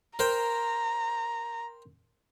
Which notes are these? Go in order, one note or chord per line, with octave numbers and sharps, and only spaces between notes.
A#4 C5 G5 A#5